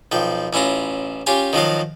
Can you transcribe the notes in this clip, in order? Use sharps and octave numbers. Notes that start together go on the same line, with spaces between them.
B1 F3 G5
A1 C#4 E4 F4 A#5
C#4 F4 G4 G5 G#5
D#3 F3 F#3 F5